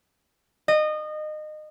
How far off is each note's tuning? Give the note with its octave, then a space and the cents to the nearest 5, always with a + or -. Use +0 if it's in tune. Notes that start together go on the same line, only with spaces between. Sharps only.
D#5 -25